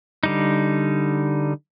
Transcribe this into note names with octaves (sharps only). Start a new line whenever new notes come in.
D3 G3 D#4